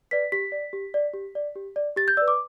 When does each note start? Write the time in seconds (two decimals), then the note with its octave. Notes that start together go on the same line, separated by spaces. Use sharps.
0.11 B4 D5 B6
0.32 G4 B6
0.52 D5
0.73 G4
0.94 D5
1.14 G4
1.35 D5
1.55 G4
1.76 D5
1.96 G4 A6
2.08 G6
2.17 B4 D5 E6
2.28 D6